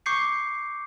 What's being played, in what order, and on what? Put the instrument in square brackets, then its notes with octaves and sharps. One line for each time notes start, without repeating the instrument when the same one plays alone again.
[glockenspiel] C#6 D6 G6 C7 C#7